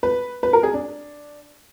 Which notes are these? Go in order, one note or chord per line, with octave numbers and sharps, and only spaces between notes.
B4
B4
A#4
G#4
D4